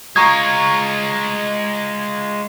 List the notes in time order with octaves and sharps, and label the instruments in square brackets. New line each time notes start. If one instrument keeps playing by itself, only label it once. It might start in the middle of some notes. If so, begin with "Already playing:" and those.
[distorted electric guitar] G#3 F4 [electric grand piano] A#5 C#6 D#6 [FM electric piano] G#6